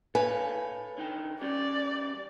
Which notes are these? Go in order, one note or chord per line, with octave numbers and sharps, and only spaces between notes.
A4 B4 C#5 F5 G#5
D3 D#4 G5
G3 C#4 G4 D5